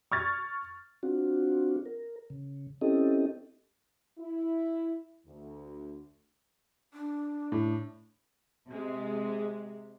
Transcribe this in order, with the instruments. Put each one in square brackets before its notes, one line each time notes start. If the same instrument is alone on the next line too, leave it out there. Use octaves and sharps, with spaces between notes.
[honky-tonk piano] C#6 F6 G#6 A6
[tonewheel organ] C4 D4 F4 F#4
A#4
C#3
C4 C#4 E4 G4 A4 D#5
[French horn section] E4
D2
[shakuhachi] D4
[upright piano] A2
[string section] C3 G#3